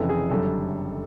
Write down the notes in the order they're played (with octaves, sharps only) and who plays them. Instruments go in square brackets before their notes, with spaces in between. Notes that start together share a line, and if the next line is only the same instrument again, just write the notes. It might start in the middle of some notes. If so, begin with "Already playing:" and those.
Already playing: [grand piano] F1 F2 C#3 E3 A4
G#4
F#1 F#2 D3 G3 A4